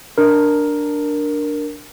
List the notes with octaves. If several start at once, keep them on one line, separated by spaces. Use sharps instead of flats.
D4 A#4